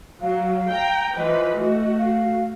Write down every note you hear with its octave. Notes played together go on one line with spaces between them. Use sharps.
F#3 F5
G5 A#5
E3 F3 B4 D#5
A3 F#4
F5